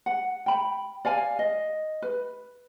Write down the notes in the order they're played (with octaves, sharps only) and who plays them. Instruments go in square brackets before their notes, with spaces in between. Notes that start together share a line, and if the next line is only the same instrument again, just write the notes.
[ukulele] F#5
G5 B5
D5 F5 G#5
D#5
B4